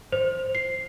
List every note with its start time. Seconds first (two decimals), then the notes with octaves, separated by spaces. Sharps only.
0.12 C5
0.55 C7